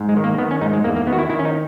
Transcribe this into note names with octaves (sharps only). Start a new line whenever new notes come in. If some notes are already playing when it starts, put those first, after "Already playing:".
Already playing: G#2
G#3
D#3
A#3
D#3 B3
C#4
G#2 D#4
G#3
E2 A#3
A#3
D#3 B3
F#4
E4
D#3 E4
C#4
D#4